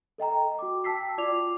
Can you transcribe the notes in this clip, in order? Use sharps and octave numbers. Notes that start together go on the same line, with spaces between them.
A4 D#5 G5 A#5
F#4 D6
G5 A5 E6 B6 C7
F4 D5 D6 F7